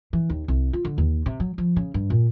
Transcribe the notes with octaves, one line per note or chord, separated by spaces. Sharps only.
E3
D#2
C2
F4
D3
D#2
C3
F#3
F3
C#3
G2
A#2